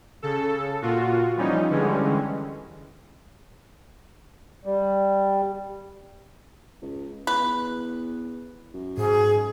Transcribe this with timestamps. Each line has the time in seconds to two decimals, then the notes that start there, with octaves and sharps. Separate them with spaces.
0.22 C#3 A4
0.82 A#2 F4 F#4
1.37 E3 F3 G3 C#4 D#4
1.70 D3 E3 G3 G#3 C#4
4.65 G3
6.82 C#2
7.27 E2 B4
8.74 F#2
8.97 G#2 G#4